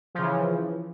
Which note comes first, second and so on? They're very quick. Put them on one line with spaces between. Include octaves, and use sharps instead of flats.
F3 C#3 E3